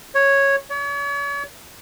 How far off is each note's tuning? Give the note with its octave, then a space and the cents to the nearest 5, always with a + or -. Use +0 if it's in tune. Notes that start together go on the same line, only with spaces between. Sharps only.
C#5 -5
C#5 +40